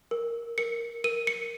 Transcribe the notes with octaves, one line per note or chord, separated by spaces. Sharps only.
A#4
A#4 C#7
A#4 D#7
C#7